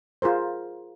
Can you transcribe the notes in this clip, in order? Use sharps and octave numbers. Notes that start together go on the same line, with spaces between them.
F4 G#4 A#4 C5